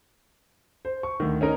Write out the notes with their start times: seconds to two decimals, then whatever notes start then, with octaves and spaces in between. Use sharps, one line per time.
0.85 C5
1.03 C#6
1.20 D2 D#3
1.41 C#4 D#4 A#4 D#5